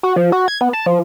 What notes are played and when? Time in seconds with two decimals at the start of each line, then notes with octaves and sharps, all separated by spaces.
0.03 F#4
0.16 F3
0.32 F#4
0.48 G#6
0.61 B3
0.73 A5
0.86 F3